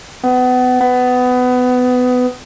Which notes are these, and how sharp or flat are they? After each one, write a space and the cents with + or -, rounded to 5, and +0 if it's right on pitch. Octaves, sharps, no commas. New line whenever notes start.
B3 +30
B3 +20